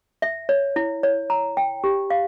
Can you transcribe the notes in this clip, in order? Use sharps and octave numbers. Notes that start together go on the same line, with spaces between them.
E5
C#5
E4
C#5
A#5
G5
G4
F5